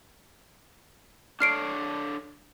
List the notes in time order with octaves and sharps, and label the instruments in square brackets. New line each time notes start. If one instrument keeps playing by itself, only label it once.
[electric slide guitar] D4 A4 C#5 [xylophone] F6 C7 D7